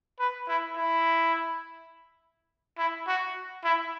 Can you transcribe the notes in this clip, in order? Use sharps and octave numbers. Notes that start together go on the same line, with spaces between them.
B4
E4
E4
E4
F#4
E4